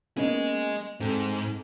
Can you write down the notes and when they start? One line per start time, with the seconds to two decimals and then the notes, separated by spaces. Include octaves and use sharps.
0.17 A#3 B3 C#4 G#4 D#5
1.00 G#2 C4 A4